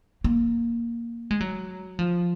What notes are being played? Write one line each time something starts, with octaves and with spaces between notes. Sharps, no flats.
A#3
G#3
F#3
F3